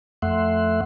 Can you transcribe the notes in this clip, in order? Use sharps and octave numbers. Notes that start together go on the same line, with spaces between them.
F2 A3 E5 F#5 C6